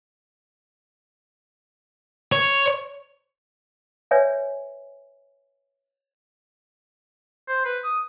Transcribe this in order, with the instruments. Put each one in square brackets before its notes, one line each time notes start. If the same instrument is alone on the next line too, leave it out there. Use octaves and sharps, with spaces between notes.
[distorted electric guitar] C#5
[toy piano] B4 C#5 D5 E5 G#5
[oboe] C5
B4
D#6